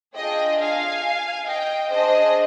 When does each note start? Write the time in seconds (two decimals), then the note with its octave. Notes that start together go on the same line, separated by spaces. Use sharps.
0.16 D4 F4 G#4 D#5 G5
0.60 F5 G#5
1.47 D#5 G5
1.91 D4 G#4 C5 D#5